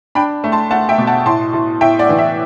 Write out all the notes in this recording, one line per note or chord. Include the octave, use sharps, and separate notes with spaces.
D4 G5 B5
A3
A5 C6
A3 F#5 A5
E5 G5
B2
F#5 A5
A2 A5 C6
A2
A2 E5 G5
D5 F#5
E3
E5